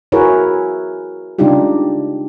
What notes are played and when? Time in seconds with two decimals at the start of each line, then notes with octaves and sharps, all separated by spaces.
0.12 E4 F#4 G#4 A#4 B4 C#5
1.38 C#3 G#3 D4 D#4 F4 G4